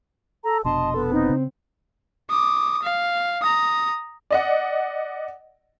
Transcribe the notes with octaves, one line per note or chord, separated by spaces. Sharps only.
A4 A#5
F1 B2 D4 D#5 A5 C6
B3 A4
C4 D#4
C#3
D6 D#6
F5
A#5 D#6
D5 D#5 F#5